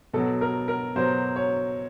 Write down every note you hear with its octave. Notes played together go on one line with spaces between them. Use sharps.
B2 F#3 A4
A#4
A#4
B2 F#3 C5
C#5